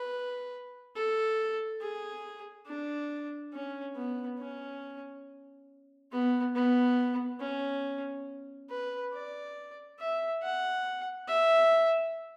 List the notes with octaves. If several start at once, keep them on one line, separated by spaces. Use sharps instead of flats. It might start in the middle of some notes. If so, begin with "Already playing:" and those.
Already playing: B4
A4
G#4
D4
C#4
B3
C#4
B3
B3
C#4
B4
D5
E5
F#5
E5